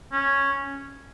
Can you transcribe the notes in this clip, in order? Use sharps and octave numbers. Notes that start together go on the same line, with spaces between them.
C#4